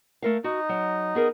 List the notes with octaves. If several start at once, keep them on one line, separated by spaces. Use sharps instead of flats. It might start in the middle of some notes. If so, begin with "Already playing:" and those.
A3 A#4 F5
D#4 F#4
F#3
B3 G#4 A#4